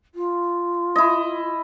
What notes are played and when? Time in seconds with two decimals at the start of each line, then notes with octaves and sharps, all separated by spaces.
0.15 F4
0.96 E4 D#5